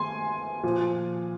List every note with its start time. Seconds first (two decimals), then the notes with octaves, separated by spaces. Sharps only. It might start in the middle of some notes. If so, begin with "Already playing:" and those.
Already playing: D#3 G#5 C6
0.63 A#2 F3